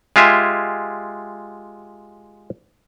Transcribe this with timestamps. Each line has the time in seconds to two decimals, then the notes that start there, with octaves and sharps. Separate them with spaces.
0.16 G#3 F4 G4 E5 G#5